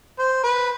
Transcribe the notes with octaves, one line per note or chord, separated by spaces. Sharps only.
C5
B4